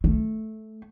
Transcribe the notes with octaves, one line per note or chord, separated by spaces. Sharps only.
A3